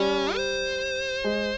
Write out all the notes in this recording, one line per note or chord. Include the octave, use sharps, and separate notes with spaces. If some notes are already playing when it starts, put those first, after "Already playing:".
Already playing: G3 C#4
C5
G#3